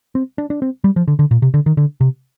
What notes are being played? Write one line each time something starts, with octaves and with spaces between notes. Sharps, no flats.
C4
D4
D4
C4
G3
F3
D3
D3
A#2
C3
D3
D#3
D3
C3